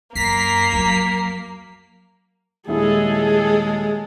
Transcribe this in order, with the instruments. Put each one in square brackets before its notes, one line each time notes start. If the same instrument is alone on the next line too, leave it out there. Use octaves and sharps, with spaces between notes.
[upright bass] F#2 [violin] A#3 [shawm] A#5 [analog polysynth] B6 C7
[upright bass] F2 F#3
[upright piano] D#1 E4 D#6 [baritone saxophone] G#3 [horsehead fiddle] G#4 A4